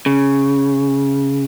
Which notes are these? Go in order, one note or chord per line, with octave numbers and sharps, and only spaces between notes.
C#3